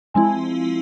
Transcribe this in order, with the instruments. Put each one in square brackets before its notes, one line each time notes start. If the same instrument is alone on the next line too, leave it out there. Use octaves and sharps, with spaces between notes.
[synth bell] F3 G#3 C4 E4 [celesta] G#5